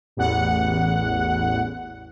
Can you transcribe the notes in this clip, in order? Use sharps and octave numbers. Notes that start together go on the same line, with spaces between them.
A1 E2 F#5